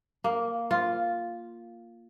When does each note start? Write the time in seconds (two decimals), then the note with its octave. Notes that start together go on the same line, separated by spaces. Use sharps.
0.24 A#3
0.71 F4